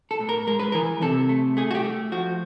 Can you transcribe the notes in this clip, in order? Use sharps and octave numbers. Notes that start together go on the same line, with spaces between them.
A4
A2
A#4
G#3 A#4
B4
E3 A#4
C3 A4
A3
A3 G#4
F#4
G4
A3
F3 F#4